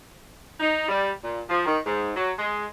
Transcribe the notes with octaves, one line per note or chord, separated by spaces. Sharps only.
D#4
G3
A#2
F3
D#3
G#2
F#3
G#3